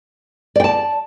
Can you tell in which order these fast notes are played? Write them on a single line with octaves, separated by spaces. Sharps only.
D5 G5 A5